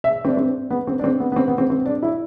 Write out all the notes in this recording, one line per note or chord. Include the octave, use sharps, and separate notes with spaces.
E5
C4
D4
C4
B3
C4
D4
C4
B3
B3
C4
B3
C4
C4
D4
E4